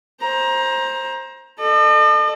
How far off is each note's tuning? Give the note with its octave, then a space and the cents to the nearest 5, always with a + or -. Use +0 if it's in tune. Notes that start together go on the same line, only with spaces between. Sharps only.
C5 +15 A#5 +20
A4 +0 D#5 -45